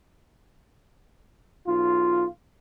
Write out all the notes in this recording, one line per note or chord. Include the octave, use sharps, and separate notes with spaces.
B1 F4